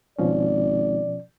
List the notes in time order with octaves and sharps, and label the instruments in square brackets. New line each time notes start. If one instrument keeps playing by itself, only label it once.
[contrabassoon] G#1 [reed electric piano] B2 F3 C#4 [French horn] D5